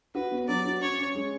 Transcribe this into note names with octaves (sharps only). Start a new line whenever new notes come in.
F#4 B4
B3
F#3 D5
F#4
C#4 C#5
C#4
G#3